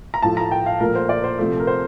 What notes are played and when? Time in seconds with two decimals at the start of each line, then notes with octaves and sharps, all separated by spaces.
0.14 A#5
0.22 A2 F3 A3 A5
0.37 A#5
0.51 G5
0.66 F5
0.80 A#2 F3 A3 A#4
0.95 C5
1.09 D5
1.24 C5
1.39 C3 F3 A3
1.60 A#4
1.67 C5